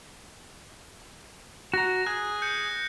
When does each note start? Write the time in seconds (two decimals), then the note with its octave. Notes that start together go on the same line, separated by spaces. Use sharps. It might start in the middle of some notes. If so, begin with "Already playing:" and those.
1.74 F#4 A#5 A#6
2.06 G#4 F#6
2.42 G6 C#7